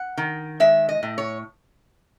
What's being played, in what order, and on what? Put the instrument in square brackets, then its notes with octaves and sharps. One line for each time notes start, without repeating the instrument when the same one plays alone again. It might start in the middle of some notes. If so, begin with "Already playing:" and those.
Already playing: [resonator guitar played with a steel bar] F#5
D#3
G#3 E5
D#5
A2
C#5